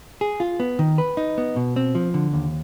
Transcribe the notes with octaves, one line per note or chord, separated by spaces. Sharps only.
G#4
F4
B3
D#3
B4
D#4
B3
B2
C4
F3
D3
D#2